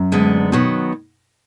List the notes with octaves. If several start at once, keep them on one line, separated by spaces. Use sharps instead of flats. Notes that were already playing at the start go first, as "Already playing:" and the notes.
Already playing: F#2
D2 D3 G#3 B3
B2 D#3 F#3 B3